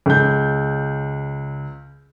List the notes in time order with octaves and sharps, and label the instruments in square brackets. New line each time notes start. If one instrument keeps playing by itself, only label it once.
[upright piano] C#2 G6